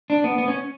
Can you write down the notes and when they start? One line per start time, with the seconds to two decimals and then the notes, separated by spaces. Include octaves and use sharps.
0.10 D4
0.24 B3
0.38 B3
0.48 C#4